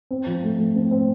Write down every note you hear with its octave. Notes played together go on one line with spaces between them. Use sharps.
C4
F3
A3
A3
C4
C4